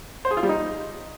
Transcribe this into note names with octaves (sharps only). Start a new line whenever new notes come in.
C5
G#4
F4
G3
D#4